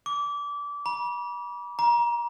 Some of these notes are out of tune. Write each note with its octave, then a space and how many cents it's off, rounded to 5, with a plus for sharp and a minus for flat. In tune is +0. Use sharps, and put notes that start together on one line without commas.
D6 -25
B5 -40
A#5 +30